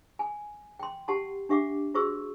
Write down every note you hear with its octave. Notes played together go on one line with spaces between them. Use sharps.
G#5
G5 C6
G4 F#5 A5 C6
D4 G4 E5 F#5 D6
F4 F#4 G#4 C5 C#6 E6